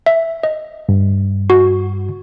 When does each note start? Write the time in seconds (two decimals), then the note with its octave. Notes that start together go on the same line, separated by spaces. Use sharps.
0.06 E5
0.43 D#5
0.89 G2
1.50 F#4